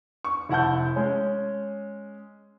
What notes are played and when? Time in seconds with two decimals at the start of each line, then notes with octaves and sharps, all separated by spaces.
0.24 C#6
0.49 F1 E4 F#5 A5 G6
0.96 G#3 C#4